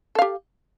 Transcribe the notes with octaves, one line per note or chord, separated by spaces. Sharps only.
G4 A4 F5